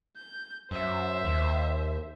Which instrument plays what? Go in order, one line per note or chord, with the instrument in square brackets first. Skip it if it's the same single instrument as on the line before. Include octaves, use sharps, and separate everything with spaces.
[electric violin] G6
[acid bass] F#2 [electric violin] C5 E5
[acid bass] D#2